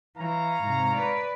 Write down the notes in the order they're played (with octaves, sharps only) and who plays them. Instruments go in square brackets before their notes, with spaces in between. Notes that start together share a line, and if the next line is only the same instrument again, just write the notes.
[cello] E3 [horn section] C#5 F5 A#5
[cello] G#2 C3
B4 D5